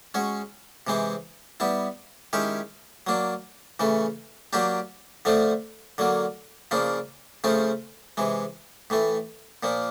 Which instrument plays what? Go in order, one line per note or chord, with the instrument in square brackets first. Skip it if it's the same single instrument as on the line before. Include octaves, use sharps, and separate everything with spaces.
[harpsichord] G#3 C#4 F#4
C3 E3 G#3 C4
G3 B3 E4
D#3 G#3 C#4 E4 G4
F#3 A#3 D4
C#3 E3 A3
F#3 A#3 D4 G4
D3 F3 A3 C4
D3 F#3 A#3
C#3 F3 A#3 D4
C#3 F3 A3 C4
C3 E3 G#3
A2 E3 A3
A#2 F3 A#3